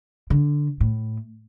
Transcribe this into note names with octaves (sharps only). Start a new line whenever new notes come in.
D3
A2